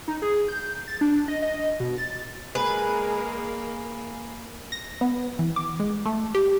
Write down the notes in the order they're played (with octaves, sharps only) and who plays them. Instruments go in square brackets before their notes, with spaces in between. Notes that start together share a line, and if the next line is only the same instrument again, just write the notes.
[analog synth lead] D#4
G#4
G6
A6
D4
D#5
D#5
B2
A6
[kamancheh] G#3 A#4 [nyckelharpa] A#3 [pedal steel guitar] G#4 [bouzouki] B4
[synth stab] A#6
B3
E3
D6
G#3
A3
G4